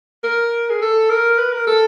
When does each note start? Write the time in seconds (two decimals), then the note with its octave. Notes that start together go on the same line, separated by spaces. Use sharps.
0.24 A#4
0.70 G#4
0.82 A4
1.10 A#4
1.38 B4
1.52 A#4
1.67 A4